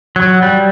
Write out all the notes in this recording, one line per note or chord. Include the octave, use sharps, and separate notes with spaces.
F#3
G3